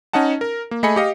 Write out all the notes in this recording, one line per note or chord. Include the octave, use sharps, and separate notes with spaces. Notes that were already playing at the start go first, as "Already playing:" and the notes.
C#4 D#4 D#5 F#5 A5
A#4
A#3
A3 G#4 D#5 G#5 B5 C#7
G4 D#5 F5